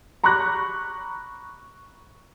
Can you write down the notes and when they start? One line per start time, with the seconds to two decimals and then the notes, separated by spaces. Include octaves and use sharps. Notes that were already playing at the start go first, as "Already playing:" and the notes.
0.24 A#5 B5 C#6 D6 F#6 A#6